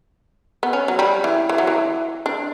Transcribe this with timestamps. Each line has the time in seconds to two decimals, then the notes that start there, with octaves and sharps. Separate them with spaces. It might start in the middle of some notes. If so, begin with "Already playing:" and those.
0.63 B3
0.73 C#4
0.88 F#3
0.99 G3
1.24 E3
1.49 E3
1.58 F#3
1.67 E3
2.26 D4